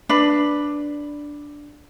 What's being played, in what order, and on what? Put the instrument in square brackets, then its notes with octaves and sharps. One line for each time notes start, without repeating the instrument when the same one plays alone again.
[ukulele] D4 B4